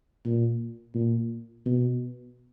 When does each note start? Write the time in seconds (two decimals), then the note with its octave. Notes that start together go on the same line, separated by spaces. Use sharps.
0.25 A#2
0.95 A#2
1.66 B2